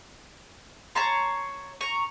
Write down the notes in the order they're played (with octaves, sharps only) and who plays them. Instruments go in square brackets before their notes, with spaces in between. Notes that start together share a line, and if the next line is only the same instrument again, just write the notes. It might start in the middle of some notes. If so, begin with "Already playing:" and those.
[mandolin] C#5 A5 A#5 C6
A#5 C#6